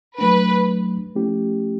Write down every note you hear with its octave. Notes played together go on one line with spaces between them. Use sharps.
F#3 A3 D4 B4
F3 A3 C#4 E4 G4